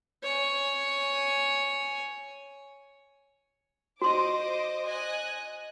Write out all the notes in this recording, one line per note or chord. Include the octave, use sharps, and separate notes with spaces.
C#5 G#5
F#4 C5 D#5 C6 D6
D#5 G#5 F#6